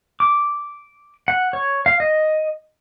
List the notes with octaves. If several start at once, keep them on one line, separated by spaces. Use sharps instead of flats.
D6
F#5
C#5
F5
D#5